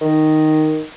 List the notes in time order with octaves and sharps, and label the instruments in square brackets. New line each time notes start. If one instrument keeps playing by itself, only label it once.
[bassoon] D#3